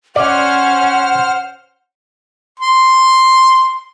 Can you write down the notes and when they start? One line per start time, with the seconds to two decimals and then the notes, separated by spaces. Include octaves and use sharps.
0.16 C#4 C5 D5 F#5 F6
2.59 C6